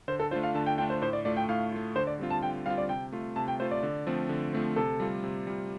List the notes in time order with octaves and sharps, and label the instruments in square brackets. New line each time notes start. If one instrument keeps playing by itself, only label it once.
[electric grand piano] D3 [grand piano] C5
[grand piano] A4
[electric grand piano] A3 D4 F4 [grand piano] C5
[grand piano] F5
[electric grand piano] D3 [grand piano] A5
[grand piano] G5
[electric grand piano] A3 D4 F4 [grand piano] G5
[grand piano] C5
[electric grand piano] A2 [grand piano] C5
[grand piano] D5
[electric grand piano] A3 F4 [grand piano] D5
[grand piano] G5
[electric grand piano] A2 [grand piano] F5
[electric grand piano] A3 F4
[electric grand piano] D3 [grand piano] C5
[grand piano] D5
[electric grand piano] G3 C4 F4
[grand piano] A5
[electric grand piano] D3 [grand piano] G5
[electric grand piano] G3 C4 F4 [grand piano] F5
[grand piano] D5
[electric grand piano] C3 [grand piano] G5
[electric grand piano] A3 F4
[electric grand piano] C3 [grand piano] A5
[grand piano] G5
[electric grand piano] A3 F4 [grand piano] C5
[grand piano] D5
[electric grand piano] D3
F3 A3 C4
D3
F3 A3 C4
[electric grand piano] C3 [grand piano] A4
[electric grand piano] G3 F4
C3
G3 F4